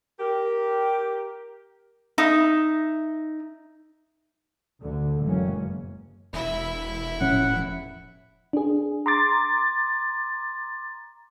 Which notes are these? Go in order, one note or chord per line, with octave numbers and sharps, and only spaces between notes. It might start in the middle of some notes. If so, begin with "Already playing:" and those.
G4 A#4
D#4 E5 D#6
D2 D3
F#1 E3 F#3 G#3 A#3 C#4
E1 E4 E5
A2 F3 C#4 F#5
D4 G#4
A#5 C6 D6 A6